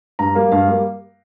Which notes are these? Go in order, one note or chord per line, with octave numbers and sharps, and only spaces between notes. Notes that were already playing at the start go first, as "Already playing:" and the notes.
G2 A#5
G3 A#3 F5
G2 F5
G3 A#3